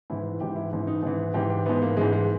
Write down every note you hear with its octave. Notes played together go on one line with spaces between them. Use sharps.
G#2 E3 E4
E4
G#2 E3 G4
E4
G#2 E3 E4
D#4
G#2 E3
G#2 E3 G4
G4
G#2 E3 B3
A#3
G#2 E3 G#3
G#3